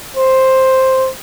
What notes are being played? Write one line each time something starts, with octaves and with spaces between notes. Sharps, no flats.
C5